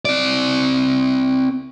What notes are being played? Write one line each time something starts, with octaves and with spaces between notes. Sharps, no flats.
C4 D5